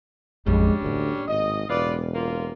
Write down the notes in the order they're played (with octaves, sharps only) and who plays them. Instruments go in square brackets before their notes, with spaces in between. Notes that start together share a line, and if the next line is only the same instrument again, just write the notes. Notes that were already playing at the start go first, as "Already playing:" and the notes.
[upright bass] A1 F2 [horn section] G3 C#4 D4 [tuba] G#3
[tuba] D2 [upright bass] A2 A#3
[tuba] G#1 [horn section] D#5
[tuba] E1 [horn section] F4 B4 D5
[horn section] A#3 F4